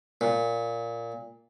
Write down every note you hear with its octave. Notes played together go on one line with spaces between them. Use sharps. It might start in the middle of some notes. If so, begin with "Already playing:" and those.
A#2